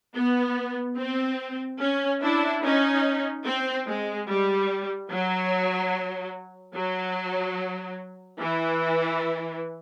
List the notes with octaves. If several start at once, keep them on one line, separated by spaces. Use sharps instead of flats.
B3
C4
C#4
D4 E4
C#4 D#4
C4
G#3
G3
F#3
F#3
E3